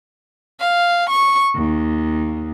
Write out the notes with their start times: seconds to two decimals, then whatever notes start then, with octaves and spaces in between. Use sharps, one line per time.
0.59 F5
1.10 C#6
1.56 D#2